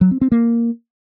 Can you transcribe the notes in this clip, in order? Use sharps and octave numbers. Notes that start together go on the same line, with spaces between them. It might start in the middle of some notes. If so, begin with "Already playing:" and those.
F#3
C4
C4
A#3